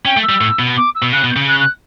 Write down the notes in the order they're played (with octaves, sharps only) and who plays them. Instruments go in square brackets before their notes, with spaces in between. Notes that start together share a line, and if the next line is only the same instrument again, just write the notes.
[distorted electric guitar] C#4 [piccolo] G5
[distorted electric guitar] A3
[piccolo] E6
[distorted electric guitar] G3
A2
B2
[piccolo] D6
E6
[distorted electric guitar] B2
[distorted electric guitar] C#3 [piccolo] F#6
[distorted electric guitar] B2
[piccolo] G6
[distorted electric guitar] C#3
[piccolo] F#6
F#6